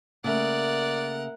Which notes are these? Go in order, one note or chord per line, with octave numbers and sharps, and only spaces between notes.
C#3 A3 A#3 A#4 D5 E5 F#5